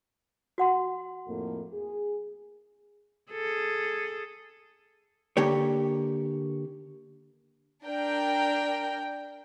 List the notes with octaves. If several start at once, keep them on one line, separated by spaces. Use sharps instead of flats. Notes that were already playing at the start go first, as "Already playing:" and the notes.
F#4 F#5 C6
F2 A2 A#3
G#4
G#4 A4
D3 A#3 G4 C#5
D4 A#4 G5